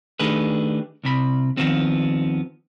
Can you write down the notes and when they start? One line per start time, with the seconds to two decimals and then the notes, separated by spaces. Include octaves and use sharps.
0.19 D#3 A3 D4 G4 G#4 B4
1.03 C2 C3 B5
1.57 D#2 G#2 D#3 F3 B3 C4